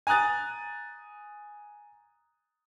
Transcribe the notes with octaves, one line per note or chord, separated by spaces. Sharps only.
G#5 A#5 D#6 F#6 A6